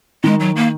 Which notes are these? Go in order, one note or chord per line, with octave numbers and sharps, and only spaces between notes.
D#3 G#3
F#3
A#3